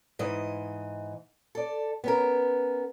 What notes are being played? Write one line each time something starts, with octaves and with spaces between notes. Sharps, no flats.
G#2 E3 D#5
A4 D5
B3 C#4 A#4